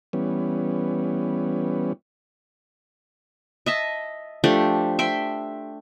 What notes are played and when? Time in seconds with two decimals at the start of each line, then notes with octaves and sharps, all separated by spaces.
0.13 E3 G3 B3 C#4
3.66 D#5 E5 A5
4.44 F3 A3 D4 G4
4.99 E5 G5 C6